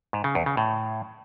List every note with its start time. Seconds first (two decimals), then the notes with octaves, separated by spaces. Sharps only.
0.13 G#2
0.24 C#3
0.35 E2
0.46 C#3
0.57 A2